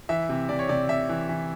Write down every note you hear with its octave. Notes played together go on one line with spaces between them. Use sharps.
E3 E5
C3
C3 D5
C#5
C3 D5
C3 E5
E3
E3